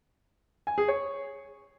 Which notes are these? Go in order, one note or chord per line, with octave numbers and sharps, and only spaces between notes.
G#5
G#4
C#5